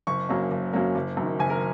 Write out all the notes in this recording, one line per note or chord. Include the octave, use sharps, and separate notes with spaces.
F#1 C#6
F#2 F#3 A#3 C#4
F#1
F#2 F#3 A#3 C#4
F#1
F#2
D#3
F#1 G#5
A#4